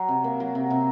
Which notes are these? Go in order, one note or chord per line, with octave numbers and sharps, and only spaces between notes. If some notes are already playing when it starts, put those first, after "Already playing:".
Already playing: F#3
C3
A#3
F#3
C3
C3